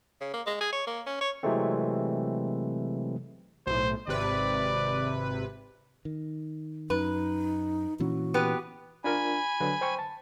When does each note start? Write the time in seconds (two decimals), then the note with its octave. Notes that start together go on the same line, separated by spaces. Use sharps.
0.21 C#3
0.34 A#3
0.47 G#3
0.61 G#4
0.73 C#5
0.87 A#3
1.06 C#4
1.21 C#5
1.43 C3 E3 F#3 G#3 A3 C4
3.66 B1 A2 C5
4.07 G#1 C3 B4 D5
6.05 D#3
6.90 F#2 D#4 B4
8.00 A#2 E3 C#4 F#4
8.34 B3 G4 B4
9.04 D4 F4 A#4 G#5 B5
9.60 D3 F#3 B4
9.81 C5 G5 C#6
9.99 A5